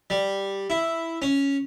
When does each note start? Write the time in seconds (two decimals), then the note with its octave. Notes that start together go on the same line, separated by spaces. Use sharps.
0.10 G3
0.70 E4
1.22 C#4